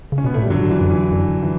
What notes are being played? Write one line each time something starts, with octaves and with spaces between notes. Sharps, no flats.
C#3
C#4
B2 B3
A3
A2 G3
G2 D3 F#3
E3
F#2
E3
F#2 D3
E3